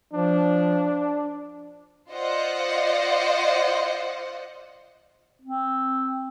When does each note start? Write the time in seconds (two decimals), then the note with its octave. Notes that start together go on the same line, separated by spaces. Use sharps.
0.14 F3 D4
2.11 F4 C5 D5 D#5 F#5
5.42 C4